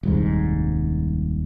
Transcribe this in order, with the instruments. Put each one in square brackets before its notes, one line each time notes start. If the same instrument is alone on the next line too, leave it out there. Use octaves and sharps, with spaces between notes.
[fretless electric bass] D#1 C2 G#2